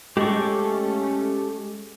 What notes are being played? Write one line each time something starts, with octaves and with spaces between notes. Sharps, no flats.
G#3 A3 C#4 G4 A4 C#6